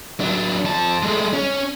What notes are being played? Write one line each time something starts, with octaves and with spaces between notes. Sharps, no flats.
F#3 D4
F2 A5
G#3 A3
C#4